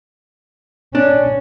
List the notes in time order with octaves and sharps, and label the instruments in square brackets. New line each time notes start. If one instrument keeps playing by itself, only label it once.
[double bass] C#4 [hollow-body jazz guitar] D4